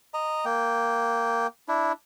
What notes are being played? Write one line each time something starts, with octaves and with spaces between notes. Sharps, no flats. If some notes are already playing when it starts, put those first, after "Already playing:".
D#5 A#5
A#3 G5
D4 E4